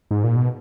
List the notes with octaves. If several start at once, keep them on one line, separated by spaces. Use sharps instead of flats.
G#2
A#2
B2